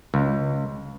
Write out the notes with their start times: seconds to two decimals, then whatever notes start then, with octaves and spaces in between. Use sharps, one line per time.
0.14 C#2